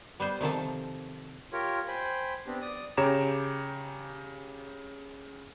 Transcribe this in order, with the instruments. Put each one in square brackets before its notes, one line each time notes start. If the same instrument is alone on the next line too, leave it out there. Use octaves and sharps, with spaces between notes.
[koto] G3 B3 C5
C3 D#3 F3 A4
[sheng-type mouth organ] F4 G4 A#4 C#5
C5 G5 G#5 B5
B3 C4 D4 G4
D5 D#6
[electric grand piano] C#3 G4 C#5 A#5 D6 E7